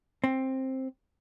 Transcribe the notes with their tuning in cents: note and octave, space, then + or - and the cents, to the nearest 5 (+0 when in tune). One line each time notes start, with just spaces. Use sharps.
C4 +10